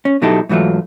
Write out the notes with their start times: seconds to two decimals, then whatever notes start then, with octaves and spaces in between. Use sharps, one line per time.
0.05 C#4
0.22 B2 F#3 D#4 E4 G4 A4
0.49 G#2 E3 F#3 A3 F4